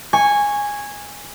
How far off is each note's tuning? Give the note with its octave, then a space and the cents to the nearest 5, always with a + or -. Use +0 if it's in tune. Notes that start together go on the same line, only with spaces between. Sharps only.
G#5 -10 C#6 +0